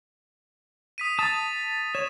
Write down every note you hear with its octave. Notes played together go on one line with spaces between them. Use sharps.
D#6 B6 D#7
A5 D#6 A6
C#5 E7